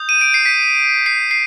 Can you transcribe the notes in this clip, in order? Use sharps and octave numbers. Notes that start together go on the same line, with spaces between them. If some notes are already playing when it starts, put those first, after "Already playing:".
Already playing: D#6 G6
D#7
D7
C7
B6
C7
C7